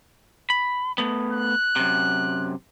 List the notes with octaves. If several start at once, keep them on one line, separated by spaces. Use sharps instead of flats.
B5
A3 B3
F#6
F#2 C3